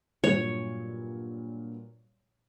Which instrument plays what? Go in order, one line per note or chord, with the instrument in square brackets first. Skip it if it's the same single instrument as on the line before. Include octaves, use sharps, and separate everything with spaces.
[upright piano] G2 A#2 F#3 [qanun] C#5